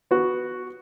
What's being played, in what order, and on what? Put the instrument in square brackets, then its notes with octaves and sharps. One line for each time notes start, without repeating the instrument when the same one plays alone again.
[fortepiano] B3 F#4